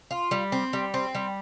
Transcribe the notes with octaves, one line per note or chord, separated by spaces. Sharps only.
F4
G3
C4
G3
C4
G3